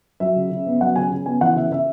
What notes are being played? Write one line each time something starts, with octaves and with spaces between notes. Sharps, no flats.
F#3 E5
C#3
C#3
B3
F#3 F#5
C#3 G#5
C#3
B3 G#5
E3 F#5
C#3 E5
C#3 E5